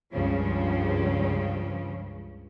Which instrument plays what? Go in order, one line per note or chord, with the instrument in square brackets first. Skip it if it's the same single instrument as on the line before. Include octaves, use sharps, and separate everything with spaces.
[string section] C#2 G2 C#3 F3